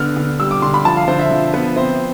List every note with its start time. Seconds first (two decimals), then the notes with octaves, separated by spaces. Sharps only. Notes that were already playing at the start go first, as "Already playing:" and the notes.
Already playing: D3 B3 F6
0.16 D3
0.40 G3 E6
0.51 D6
0.62 D3 C6
0.74 B5
0.85 F3 A5
0.96 F5
1.08 D3 C5
1.19 E5
1.31 F3
1.53 B3 B4
1.76 C4 C5